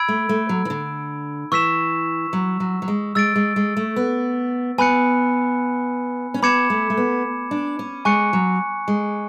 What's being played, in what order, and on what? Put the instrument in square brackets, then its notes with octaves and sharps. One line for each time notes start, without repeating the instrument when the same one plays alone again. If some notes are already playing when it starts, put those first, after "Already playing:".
Already playing: [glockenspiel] B5 E6 G#6 D7
[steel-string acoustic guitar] A3
A3
F#3
E3
D3
[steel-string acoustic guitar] E3 [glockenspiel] C#6 E6 B6 E7
[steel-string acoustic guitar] F#3
F#3
F#3
G#3
[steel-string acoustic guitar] G#3 [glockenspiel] E6 A6 D7
[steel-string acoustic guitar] G#3
G#3
A3
B3
[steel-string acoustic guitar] B3 [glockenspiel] G#5 B5 F#6 C#7
[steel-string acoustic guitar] C#4
[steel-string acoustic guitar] B3 [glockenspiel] B5 D6 G#6 C#7 E7
[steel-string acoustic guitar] A3
A3
B3
D4
C#4
[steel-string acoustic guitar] G#3 [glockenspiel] G#5 C#6 F#6 C#7
[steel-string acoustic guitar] F#3
G#3